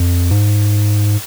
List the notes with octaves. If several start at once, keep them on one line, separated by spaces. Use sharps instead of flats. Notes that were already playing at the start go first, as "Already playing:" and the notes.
Already playing: F2
G#2